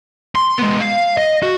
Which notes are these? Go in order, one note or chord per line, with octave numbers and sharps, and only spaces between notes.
C6
G#3 B3
F5
D#5
F#4